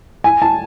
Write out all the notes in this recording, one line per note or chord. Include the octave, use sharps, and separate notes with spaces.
G#5
A5